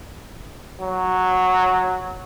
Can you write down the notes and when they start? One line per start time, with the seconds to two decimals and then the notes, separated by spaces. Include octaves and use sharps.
0.82 F#3